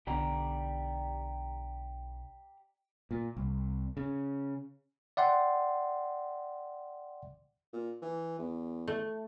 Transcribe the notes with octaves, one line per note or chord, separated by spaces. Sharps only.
B1 D3 G4 D5 A#5
A#2
C2
C#3
D5 E5 F#5 G5 C6
A#2
E3
E2
A3